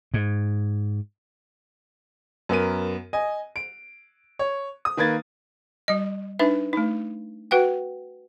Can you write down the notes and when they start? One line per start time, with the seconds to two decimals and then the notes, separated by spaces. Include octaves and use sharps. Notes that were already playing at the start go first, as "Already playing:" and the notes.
0.14 G#2
2.49 F#2 B3 A#4 D#7
3.13 D#5 G#5
3.56 D7
4.39 C#5
4.85 D#6
4.97 D#3 A#3 B4 G#6 A6
5.88 G3 D#5
6.39 D4 D#4 B4 E5
6.73 A3 D#4
7.51 F#4 B4 F#5 G5